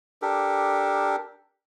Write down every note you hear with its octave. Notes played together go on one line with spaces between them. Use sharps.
D4 G4 A4 A#4